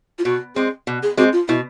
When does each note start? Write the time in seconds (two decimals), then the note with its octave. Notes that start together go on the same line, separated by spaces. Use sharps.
0.19 F4
0.25 B2 F#4
0.56 G#3 C4 G#4
0.87 B2
1.03 G#4
1.17 G#3 C4 F#4
1.33 F4
1.48 B2 E4